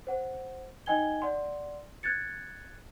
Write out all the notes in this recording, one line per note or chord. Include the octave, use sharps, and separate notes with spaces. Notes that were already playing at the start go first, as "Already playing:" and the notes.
C5 F#5
D#4 D#5 G5 G#5 G#6 G7
D5 F#5 C6
F#6 G#6 A6 C#7